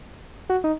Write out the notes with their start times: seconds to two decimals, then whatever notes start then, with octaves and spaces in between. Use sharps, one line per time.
0.50 F#4
0.64 D#4